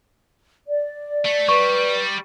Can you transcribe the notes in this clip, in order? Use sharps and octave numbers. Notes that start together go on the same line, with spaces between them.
D5
A3
G3 B4 C#6